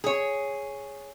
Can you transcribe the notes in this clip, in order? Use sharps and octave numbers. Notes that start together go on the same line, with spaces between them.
G#4 C#5